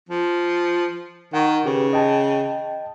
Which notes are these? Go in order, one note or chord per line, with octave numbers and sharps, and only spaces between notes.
F3
D#3 F#5 C#6
C#3 G4 B4
D#5 G5 A5